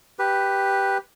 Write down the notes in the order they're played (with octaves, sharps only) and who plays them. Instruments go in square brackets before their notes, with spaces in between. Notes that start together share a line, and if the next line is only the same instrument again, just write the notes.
[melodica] G4 B4